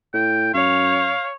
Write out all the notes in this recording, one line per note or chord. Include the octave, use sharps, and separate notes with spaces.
A2 G5
F#2 C#5 F5